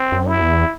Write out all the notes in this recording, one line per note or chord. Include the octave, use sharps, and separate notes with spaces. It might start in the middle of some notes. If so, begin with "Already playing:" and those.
Already playing: C4
F#2
E4
E2